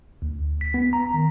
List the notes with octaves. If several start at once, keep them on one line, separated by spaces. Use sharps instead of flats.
D2
B6
B3
A#5
D#3